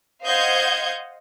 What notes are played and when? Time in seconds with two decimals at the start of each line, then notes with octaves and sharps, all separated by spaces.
0.24 C5 D#5 F5 F#5 G6 G#6